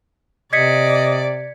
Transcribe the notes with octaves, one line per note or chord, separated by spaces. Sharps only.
C3 D5 D#5 G#6 B6 C#7